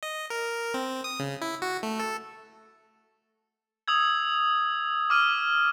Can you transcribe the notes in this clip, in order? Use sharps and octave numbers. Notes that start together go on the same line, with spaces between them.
D#5
A#4
C4
D#6
C#3
E4
F#4
A3
A4
D#6 E6 G#6
D6 F6 D#7